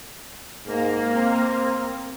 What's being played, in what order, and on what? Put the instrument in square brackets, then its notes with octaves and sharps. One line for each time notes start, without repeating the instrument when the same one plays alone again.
[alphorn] G#2 [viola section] A#3
[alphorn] C4